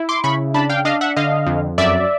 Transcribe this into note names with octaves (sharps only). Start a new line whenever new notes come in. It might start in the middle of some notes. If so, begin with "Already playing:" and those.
Already playing: E4
C6 D6
C#3 B5 C#6
D4 A5 B5
F5 G5
D4 D#5 F5
E5 F#5
D3 D#5 F5
F2
F#2 D5 E5